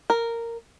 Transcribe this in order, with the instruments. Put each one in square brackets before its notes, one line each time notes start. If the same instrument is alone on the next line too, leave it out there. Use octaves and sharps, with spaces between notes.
[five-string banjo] A#4